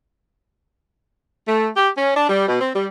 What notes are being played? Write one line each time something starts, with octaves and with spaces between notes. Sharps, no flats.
A3
G4
C#4
D4
G3
B2
C4
G3